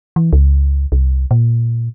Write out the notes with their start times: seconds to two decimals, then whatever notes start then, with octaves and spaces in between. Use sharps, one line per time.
0.16 E3
0.33 C#2
0.92 C2
1.31 A#2